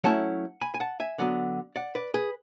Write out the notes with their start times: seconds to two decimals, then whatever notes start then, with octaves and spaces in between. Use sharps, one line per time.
0.04 F#3 A3 C#4 E4 F#5 A5
0.61 G#5 B5
0.74 G#5
0.80 F#5 A5
1.00 E5 G#5
1.18 D3 F#3 B3 D5 F#5
1.76 D5 F#5
1.95 B4 D5
2.14 G#4 B4